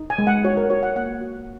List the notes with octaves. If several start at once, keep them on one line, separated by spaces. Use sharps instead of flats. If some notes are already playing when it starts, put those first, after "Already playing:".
Already playing: D#4
G#5
G#3
F#5
F#4 C#5
A#4
F#4 C#5
F#5
A#3 F#5
F#4